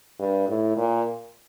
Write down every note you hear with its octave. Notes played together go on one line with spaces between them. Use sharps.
G2
A2
A#2